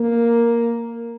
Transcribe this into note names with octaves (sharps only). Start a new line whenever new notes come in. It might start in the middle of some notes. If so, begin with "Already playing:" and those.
Already playing: A#3